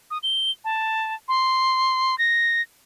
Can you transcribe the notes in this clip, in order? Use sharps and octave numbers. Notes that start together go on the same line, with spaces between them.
D#6
G7
A5
C6
A#6